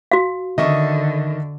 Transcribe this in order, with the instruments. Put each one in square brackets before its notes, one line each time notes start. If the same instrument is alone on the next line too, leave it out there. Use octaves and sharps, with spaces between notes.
[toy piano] F#4 F5
[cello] D3 [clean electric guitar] D#3 [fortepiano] D#5 E5 C#6